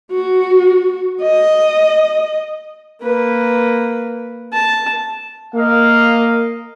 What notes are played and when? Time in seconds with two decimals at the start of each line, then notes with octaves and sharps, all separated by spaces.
0.11 F#4
1.22 D#5
3.02 A#3 B4
4.53 A5
5.55 A#3 D#5 F5